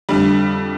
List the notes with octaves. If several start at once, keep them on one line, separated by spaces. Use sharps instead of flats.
F2 D3 G3